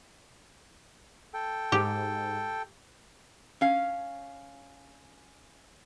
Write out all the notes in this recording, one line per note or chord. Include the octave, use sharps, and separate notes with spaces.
A4 G5
G#2 G4
C#4 F5